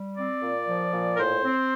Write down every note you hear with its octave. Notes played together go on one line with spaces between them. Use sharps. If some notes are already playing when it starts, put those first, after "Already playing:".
Already playing: G3
C4 D5
A#2
F3
A#2
A#4
A2 C5
C4